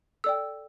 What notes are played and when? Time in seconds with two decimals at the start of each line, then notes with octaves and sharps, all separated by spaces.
0.24 A4 D5 G5 E6